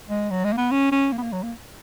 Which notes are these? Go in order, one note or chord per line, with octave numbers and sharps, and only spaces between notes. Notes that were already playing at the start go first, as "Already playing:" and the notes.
G#3
F#3
G#3
A#3
B3
C#4
C#4
A#3
B3
A#3
F#3
A#3